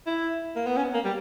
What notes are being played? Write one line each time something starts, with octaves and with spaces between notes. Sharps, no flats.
E4
A#3
B3
C#4
A#3
G3